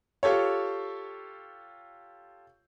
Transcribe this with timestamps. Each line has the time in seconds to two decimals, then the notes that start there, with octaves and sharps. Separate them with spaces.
0.23 F4 G4 A4 C#5